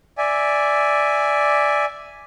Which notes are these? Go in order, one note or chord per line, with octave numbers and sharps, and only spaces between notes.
D5 E5 G#5